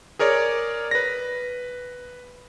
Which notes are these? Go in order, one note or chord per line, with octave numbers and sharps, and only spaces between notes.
G#4 A#4 C#5 D5
B4 A#6